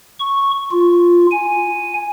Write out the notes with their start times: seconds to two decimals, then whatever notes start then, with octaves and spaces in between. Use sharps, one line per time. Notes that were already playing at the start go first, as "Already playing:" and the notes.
0.19 C#6
0.71 F4
1.31 G#5